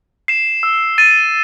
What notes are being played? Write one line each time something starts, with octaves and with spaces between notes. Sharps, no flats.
C7 E7
E6
A6 D#7